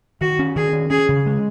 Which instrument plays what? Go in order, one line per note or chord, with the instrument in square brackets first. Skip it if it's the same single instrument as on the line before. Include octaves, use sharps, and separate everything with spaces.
[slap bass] D#3 [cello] F#4
[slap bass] C#4
[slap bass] D#3 [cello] G#4
[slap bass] C#4
[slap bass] C#4 [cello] G#4
[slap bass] C#3
G#3